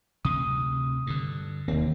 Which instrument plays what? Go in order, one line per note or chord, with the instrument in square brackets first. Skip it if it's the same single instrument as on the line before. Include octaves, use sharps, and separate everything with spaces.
[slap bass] D2 C3 [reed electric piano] D#6
[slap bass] G2 D3
[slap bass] E1 C4 [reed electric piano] D#2